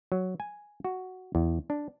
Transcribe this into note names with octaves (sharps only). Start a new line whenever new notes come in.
F#3
G#5
F#4
E2
D4